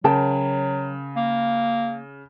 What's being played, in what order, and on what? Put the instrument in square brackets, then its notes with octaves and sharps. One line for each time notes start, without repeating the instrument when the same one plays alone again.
[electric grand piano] C#3 [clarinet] F#3 [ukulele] A#4 G5 A5
[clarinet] A#3